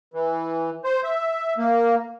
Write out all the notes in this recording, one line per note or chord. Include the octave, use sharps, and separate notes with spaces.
E3
C5
E5
A#3